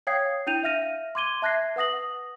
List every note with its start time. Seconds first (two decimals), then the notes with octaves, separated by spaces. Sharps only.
0.07 C#5 F5 G5 D#6 G#6 C7
0.47 D4 E4 G5 G6 D#7 F7
0.63 E5 F5 F6 A#6 D#7
1.15 C6 D6 G#6 D#7 G7
1.42 E5 A5 F#6 G#6 A#6 C7
1.76 B4 F#5 D#6 A#6 F#7